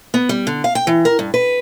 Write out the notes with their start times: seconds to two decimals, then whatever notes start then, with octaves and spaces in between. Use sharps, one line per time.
0.14 B3
0.29 G3
0.47 D3
0.64 F5
0.75 G5
0.87 E3
1.05 A#4
1.19 G2
1.34 B4